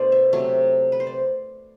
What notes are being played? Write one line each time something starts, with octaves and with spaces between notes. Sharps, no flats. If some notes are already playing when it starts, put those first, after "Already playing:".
Already playing: B2 A3 D4 C5 D5
E5
C3 F#3 A3
B4
C5
D5